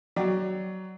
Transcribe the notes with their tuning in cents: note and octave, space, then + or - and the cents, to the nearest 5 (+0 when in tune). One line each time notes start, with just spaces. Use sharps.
F#3 +20 D5 +20 G5 +0